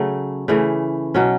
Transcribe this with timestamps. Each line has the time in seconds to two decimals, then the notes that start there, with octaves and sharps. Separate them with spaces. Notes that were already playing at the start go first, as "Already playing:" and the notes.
Already playing: C#3 F#3 A3
0.48 C#3 E3 A3
1.14 B2 F#3 C#4